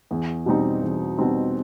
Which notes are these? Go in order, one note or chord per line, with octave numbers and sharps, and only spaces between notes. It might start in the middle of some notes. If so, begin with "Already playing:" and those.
E2
B2 G3 C4 D#4
E2
B2 G3 C4 D#4